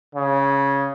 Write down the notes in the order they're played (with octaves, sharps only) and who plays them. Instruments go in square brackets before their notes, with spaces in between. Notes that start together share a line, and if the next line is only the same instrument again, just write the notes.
[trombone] C#3